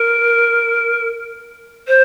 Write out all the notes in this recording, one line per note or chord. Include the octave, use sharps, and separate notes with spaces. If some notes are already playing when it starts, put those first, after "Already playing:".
Already playing: A#4
C5